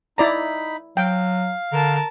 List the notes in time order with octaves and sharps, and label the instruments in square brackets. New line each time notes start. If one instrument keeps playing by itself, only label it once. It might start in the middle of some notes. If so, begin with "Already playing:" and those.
[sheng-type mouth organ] D#4 B5 [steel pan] E4 D5 A#5
[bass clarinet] F#3 [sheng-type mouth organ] F5 [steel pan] G5
[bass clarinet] D3 [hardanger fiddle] A#4 A5